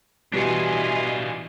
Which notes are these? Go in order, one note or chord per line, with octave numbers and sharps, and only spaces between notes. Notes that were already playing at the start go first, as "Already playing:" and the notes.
B2 E3 G3 D4 F4 D#5 G#5 C#7